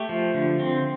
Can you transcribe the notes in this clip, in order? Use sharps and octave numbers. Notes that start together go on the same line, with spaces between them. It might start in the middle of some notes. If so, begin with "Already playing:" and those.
Already playing: A3 G4
F3
D3
C4